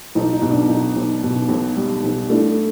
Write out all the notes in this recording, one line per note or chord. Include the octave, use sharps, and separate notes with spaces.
B1 D#4
D#4
B2
D4
B1 D#4
B1
B2
B1
G3
B1
A3 D4 E4